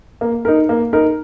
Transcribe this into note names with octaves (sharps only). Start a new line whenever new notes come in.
A#3
D#4 A#4
A#3
D#4 A#4